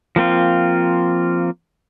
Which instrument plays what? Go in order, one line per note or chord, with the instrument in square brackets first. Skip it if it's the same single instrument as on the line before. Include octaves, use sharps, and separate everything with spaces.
[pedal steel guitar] F3 A#3 C4 F4